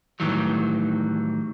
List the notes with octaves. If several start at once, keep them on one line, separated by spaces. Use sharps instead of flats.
A2 D#3 E3 F#3 G3